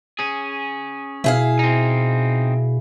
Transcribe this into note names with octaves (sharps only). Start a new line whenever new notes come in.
C#4 G#4
B2 E4 G#4 F5
C4 D#4